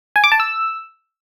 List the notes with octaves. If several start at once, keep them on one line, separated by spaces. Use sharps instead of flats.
G#5
D6
A5
E6